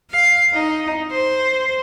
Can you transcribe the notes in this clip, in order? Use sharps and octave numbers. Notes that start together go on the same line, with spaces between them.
F5
D#4
C5